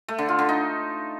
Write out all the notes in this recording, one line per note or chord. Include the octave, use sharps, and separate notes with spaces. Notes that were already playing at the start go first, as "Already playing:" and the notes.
A3
D3
F4
D3
D#4